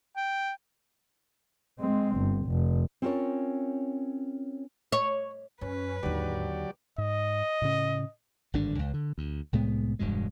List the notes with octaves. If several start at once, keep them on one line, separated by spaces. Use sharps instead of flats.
G5
G#3 C4
G1
F1
C4 C#4 F4 A4 A#4 C#5
C#5
F#2 C#4 B4
D#2 G#2 D3 F#3 G4 D5
G#2 D#5
A2 C#3 C#4
G#1 G2 D3 D4
C#2
D3
D2
C2 A2 G#3 B3
E1 G2 B2 G#3